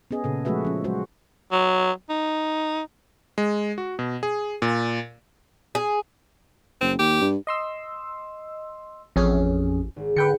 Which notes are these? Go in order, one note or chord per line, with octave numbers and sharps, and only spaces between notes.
B3 C#4 G#4 D#5
A#2 C#3 A4
F3 G#3 A3 F#4 B4 E5
F3 C#4
F#3 G#3 F#4 C5
F#3
D#4
G#3
F#4
B2
G#4
A#2
G#4
F#1 C4
D#2 G4
G2
D#5 C6 E6
A1 F2 C#4 G#4
G#1
D3 B4 G5 C#7